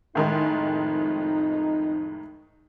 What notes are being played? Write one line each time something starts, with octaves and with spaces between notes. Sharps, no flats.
F2 A2 D#3 G#3 D#4